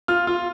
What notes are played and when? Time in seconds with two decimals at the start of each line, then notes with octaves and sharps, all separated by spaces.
0.08 F4 F6
0.27 F4